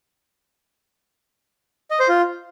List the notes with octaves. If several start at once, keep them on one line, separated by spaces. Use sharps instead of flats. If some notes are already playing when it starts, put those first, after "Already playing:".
D#5
C5
F4